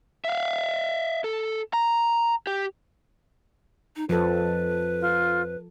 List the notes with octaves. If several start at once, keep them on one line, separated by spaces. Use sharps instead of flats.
E5 F5
A4
A#5
G4
D#4
F2 F3 A4 B4
F4